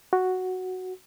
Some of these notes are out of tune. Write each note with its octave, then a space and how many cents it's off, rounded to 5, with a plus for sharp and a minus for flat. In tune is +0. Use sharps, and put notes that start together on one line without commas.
F#4 +0